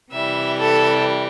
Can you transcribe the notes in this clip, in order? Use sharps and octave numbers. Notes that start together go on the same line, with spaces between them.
C3 E3 G3 E5
A4